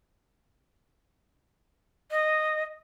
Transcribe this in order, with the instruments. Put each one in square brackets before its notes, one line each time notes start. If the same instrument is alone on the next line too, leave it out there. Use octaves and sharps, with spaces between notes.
[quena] D#5